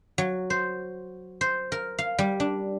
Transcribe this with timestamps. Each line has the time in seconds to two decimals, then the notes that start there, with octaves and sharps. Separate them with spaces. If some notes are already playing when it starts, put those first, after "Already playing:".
0.18 F#3
0.50 C5
1.41 C5
1.72 A#4
1.99 F5
2.19 G3
2.40 D4